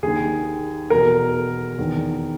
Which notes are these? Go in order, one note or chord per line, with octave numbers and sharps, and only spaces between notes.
D#2 D#3 G#4
E2 B2 A#4
E2 D#3